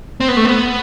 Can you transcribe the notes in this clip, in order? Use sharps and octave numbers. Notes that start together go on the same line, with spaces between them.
C4
B3
A3
B3